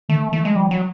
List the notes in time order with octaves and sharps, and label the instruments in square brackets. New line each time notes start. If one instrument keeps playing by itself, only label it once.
[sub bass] D#3 [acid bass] A3
[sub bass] E3 [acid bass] A3
[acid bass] G#3
[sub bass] F3 [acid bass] G3
[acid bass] F#3